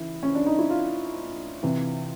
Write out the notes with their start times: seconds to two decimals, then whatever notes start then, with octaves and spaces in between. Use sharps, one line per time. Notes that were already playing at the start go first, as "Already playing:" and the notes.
Already playing: C#3 E3 E4
0.23 C#4
0.35 D4
0.46 D#4
0.59 E4
0.70 F4
1.63 C3 E3